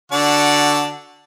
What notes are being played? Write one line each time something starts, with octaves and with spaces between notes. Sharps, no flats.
D3 D4 F#4